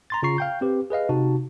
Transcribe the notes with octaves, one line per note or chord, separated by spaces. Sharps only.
A#5 C6 A6
C#3 F4 A#5 C#6 C7
F5 G5 G6
C4 G4 B4
G#4 B4 D#5 F5
C3 D#4 F#4 A5